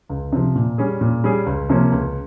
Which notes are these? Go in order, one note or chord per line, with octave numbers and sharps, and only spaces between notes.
C#2
C3 F3
A#2
G3 C#4 G#4
A#2
G3 C#4 G#4
C#2
C3 F3 A#3 C#4
C#2